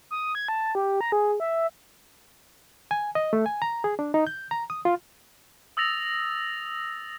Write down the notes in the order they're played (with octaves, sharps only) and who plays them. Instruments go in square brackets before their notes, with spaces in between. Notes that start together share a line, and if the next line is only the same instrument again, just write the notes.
[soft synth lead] D#6
G#6
A5
G4
A#5
G#4
E5
[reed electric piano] G#5
D#5
A3
G#5
A#5
G#4
D4
D#4
G6
A#5
D#6
F4
[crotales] D#6 E6 A6 A#6 F7